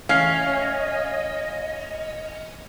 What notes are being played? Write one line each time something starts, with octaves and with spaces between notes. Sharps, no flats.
E3 A3 C#4 D#5 F5 F6 C7